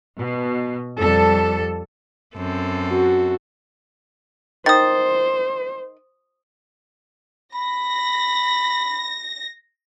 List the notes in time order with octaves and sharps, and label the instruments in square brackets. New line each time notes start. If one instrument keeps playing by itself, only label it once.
[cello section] B2
F2 G3 A4
[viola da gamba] F#2 C4 A4
[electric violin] F#4
[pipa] D#3 [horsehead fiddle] C5 [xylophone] D#6 A6
[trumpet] B5 [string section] A#6